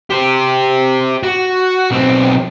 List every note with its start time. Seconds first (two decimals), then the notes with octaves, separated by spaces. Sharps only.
0.10 G4 C5
1.23 F#4
1.91 B1 C4